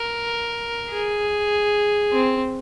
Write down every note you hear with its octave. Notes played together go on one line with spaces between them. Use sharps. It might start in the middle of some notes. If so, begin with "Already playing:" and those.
Already playing: A#4
G#4
C4